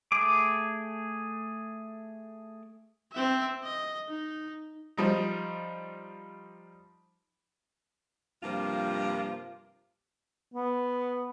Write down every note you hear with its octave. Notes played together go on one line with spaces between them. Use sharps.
A3 G#4 D6
C4 E5
D#5
D#4
F3 G3 D#4
G2 C3 F3 A#3 F4
B3